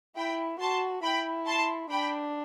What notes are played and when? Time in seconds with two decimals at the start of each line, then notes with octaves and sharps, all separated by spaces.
0.17 E4 G5 B5
0.60 F#4 A5 C6
1.04 E4 G5 B5
1.47 A5 C6
1.90 D4 G5 B5